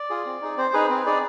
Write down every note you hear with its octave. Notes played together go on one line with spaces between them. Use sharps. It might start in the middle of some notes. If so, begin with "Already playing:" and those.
Already playing: D5
F4 G#4
C4
D#4 G#4
C4 C5
D#4 G#4 B4
C4 B4
D#4 G#4 D5